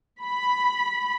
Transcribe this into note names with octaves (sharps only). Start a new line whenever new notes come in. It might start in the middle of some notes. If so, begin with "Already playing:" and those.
B5